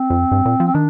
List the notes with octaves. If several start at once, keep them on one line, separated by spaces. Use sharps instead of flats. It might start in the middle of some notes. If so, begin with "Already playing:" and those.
Already playing: C4
F2
G2
A#2
F3
C4
D#3 D4